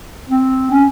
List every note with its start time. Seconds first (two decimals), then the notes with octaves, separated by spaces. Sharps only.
0.29 C4
0.70 C#4